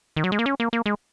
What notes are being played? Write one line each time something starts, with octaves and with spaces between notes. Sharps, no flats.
D#3
F#3
G#3
A#3
C#4
A#3
A#3
G#3